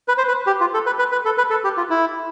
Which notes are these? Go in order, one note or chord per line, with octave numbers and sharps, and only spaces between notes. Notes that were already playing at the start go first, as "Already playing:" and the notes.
B4
C5
B4
G4
F4
A4
B4
B4
B4
A4
B4
A4
G4
F4
E4